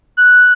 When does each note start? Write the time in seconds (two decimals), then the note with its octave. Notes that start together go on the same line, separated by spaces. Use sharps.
0.17 F#6